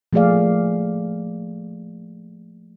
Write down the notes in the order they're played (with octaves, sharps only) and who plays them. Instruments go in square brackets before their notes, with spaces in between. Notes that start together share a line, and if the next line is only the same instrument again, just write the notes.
[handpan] F3 A3 A#3 G#4 D5 F5